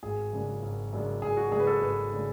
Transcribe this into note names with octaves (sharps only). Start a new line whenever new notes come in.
G#1 G#4
F#2 C#3 G#3 D4
G#1
F#2 C#3 G#3 D4
G#1 G#4
F#4
F#2 C#3 G#3 D4 G#4
B4
A4
G#1 B4
C#3 G#3 D4